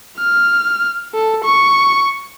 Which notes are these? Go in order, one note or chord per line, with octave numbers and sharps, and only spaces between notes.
F6
A4
C#6